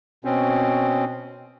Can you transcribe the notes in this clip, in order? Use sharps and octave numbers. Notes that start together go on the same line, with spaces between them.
B2 C4 C#4